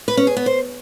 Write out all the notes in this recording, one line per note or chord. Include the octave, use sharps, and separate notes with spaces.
B4
C#4
G#4
B3
C5